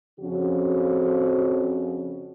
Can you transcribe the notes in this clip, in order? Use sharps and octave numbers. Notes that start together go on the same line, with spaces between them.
F2 C#3 F3 C#4 F#4